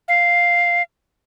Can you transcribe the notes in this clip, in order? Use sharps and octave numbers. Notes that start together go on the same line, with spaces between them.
F5